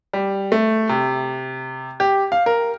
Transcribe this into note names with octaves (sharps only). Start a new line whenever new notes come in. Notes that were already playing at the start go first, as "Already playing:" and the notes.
G3
A3
C3
G4
F5
A#4